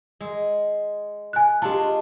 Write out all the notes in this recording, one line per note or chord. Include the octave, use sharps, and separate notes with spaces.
G#3
G#5 F#6
G#3 D4 F4 G4 A5